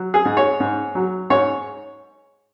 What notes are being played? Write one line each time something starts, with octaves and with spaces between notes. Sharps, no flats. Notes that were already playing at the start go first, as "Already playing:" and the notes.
Already playing: F#3
G#4
G#2
C#5
G#2
F#3
G#2 C#5